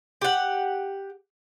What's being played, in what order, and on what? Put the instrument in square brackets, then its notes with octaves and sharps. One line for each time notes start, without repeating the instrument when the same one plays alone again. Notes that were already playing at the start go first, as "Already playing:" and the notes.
[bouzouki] G4 F#5